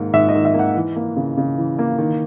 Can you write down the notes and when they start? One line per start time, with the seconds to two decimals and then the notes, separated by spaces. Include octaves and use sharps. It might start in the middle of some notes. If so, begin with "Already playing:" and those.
Already playing: G#2 D#3 A#3
0.13 G#2 E5
0.29 D#5
0.35 D#3
0.45 E5
0.54 A#3
0.59 F#5
0.75 E3
0.96 A#3
1.16 C#3
1.38 C#3
1.58 E3
1.79 A#3
1.98 D#3